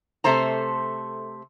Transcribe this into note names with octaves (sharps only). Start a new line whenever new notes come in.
C3 A3 A4 C5 A#5